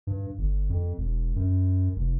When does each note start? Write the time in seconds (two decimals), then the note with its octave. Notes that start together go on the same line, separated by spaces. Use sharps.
0.07 G2
0.38 G1
0.70 F2
0.98 E1
1.36 F#2
1.96 F1